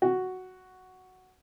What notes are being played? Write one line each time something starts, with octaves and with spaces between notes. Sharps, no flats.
F#4